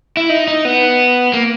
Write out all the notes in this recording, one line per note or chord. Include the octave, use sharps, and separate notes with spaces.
E4
D#4
D#4
B3
A#3